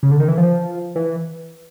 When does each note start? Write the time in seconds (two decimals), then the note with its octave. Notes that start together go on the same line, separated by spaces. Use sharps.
0.03 C#3
0.11 D3
0.20 D#3
0.28 E3
0.38 F3
0.96 E3